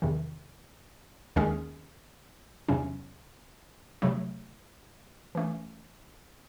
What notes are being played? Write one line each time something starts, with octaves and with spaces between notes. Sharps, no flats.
E2 C3 D#3
D#2 D#3 G#3 C#4 G#4
E2 C3 F#3 C#4
C3 F#3 A3
E3 A3 C#4